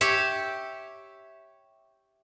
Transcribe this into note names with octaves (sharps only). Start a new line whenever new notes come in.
G4 C#5 E5